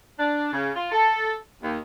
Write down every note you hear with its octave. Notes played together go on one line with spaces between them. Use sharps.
D4
C#3
F4
A4
D#2